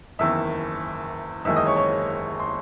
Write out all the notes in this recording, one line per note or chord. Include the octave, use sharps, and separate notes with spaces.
F#1 E2 D#3 E5 E6
F#1 E2 D#3 G#3 E5 E6
D#5 D#6
C#5 C#6
C#5 C#6
C6